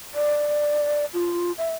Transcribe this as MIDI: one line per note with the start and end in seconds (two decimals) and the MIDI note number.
0.14 1.05 74
1.14 1.52 65
1.58 1.75 76